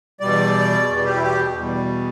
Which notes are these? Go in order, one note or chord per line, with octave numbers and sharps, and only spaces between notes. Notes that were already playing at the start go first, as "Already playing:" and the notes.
E2 B2 G3 D5
E2 B2 G3
G4
E4
G4
E2 B2 G3